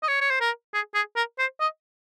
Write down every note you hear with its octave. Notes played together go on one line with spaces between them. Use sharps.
D#5
C#5
C#5
C5
A#4
G#4
G#4
A#4
C5
D#5